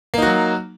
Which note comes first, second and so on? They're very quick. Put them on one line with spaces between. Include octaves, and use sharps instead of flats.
A#3 D#4 F#4 F#3